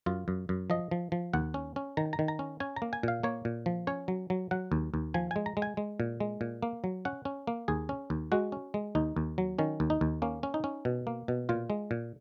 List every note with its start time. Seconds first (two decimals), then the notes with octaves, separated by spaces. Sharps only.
0.06 F#2 F4
0.28 F#2
0.49 F#2
0.70 F3 D#5
0.91 F3
1.12 F3
1.33 D#2 F#5
1.54 C#4
1.76 C#4
1.97 D#3 A#5
2.13 A#5
2.19 D#3
2.28 A#5
2.39 C#4
2.60 C#4 G#5
2.76 A#5
2.82 A#3
2.93 G#5
3.03 A#2 F5
3.23 A#3 C#5
3.45 A#2
3.66 F3
3.87 C#4 C#5
4.08 F#3
4.30 F#3
4.51 F#3 F#5
4.72 D#2
4.94 D#2
5.14 F3 G#5
5.31 G#3 G#5
5.46 A#5
5.57 G#3
5.62 G#5
5.77 G#3
6.00 A#2
6.20 G#3
6.41 A#2
6.63 A#3
6.84 F#3
7.05 C#4 F#5
7.25 C#4
7.47 A#3
7.68 D#2 G#4
7.89 C#4
8.10 D#2
8.32 G#3 F#4
8.52 C#4
8.74 G#3
8.95 D#2 D#4
9.16 D#2
9.38 F#3
9.59 D#3 C#4
9.80 D#2
9.90 D#4
10.01 D#2
10.22 A#3 C#4
10.43 C#4
10.54 D#4
10.64 C#4
10.85 B2
11.07 A#3
11.28 B2
11.49 A#2 F4
11.70 G#3
11.91 A#2